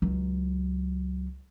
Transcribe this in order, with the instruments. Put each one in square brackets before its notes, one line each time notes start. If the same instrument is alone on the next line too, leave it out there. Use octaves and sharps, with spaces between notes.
[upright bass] C#2 F#3